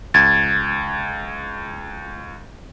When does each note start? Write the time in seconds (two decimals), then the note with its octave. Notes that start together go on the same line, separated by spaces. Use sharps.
0.14 C#2 G#6 A6